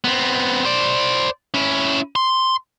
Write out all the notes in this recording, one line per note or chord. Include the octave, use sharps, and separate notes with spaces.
B3 C4
C5 D5
C#4 E4
C6